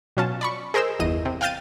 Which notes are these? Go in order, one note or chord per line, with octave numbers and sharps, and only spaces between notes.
B2 F#3 C#4 F4 A5
D5 B5 C#6
G#4 A#4 C5 D#5 E6
G1 E2 D#5 D#7
C3
F5 G5 F6 G6 A6 D#7